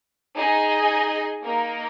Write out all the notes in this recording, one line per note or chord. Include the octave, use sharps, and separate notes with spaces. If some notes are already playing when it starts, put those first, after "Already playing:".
D#4 G#4 D#5 G#5
A#3 D#4 A#4